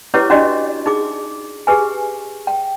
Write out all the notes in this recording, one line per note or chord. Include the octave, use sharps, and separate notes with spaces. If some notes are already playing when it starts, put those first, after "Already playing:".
C#4 E4 G4 B4 C#5 D6
C#4 D4 F#4 G4 D5 D#5
D#4 G#4 D6
G4 G#4 B4 G#5
G5